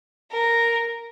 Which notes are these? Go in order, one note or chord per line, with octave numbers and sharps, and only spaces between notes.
A#4